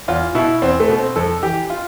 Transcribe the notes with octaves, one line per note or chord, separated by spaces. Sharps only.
E2 F4
B2 E4
E2 C4
A3
B2
C4
F2 A4
E3 G4
F4